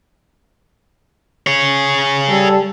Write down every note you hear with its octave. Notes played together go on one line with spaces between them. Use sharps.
G#4 C#5
G3 A4